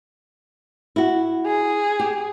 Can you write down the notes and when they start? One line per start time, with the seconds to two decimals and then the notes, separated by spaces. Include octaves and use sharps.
0.96 E4 F#4
1.46 G#4
1.99 G4